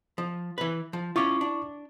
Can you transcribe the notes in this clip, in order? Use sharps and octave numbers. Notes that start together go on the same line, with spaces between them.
F3
E3 B4
F3
C#4 E4 F4 C#6 D6
D4